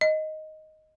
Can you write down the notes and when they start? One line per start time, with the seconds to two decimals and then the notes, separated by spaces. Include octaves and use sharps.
0.01 D#5